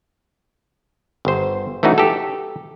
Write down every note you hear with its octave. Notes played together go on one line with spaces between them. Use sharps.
G1 C5
E3 A3 C#4 D#4 F#4
G4 A4